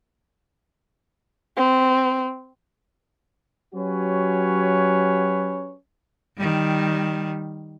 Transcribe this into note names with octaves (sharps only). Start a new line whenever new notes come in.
C4
F#3 C#4 F#4 G4 B4 C#5
D#3 G3